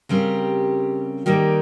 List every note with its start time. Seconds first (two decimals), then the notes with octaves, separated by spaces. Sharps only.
0.09 C#3 G3 C4 G4 A#4
1.26 D#3 G3 A#3 D#4